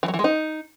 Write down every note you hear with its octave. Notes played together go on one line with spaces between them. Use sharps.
E3
F#3
E3
G#3
D#4